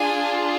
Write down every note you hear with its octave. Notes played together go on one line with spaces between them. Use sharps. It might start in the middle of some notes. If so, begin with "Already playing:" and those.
Already playing: D4 F4 G#4 G#5